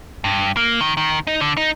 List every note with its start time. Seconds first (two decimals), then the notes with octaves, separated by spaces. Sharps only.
0.24 G2
0.57 A#3
0.81 D#3
0.97 D#3
1.27 D#4
1.41 D3
1.57 D#4